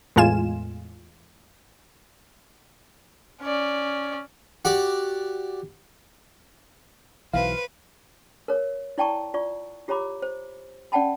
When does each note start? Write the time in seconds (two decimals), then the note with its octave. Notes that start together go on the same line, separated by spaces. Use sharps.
0.16 E2 A2 G#3 F4 G#5 E7
3.42 C#4 D5
4.65 F#4 G4 D5
7.33 B1 E3 B4 C5 F5
8.48 A#4 C#5
8.98 E4 D5 G5 A5 A#5 C#6
9.34 F4 D5 C#6
9.88 F4 G4 C#5 A#5 B5 D6
10.22 C5
10.92 C#4 D5 F#5 G5 A5 B5